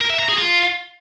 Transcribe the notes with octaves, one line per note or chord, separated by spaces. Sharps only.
A#4
E5
A#5
G#4
F4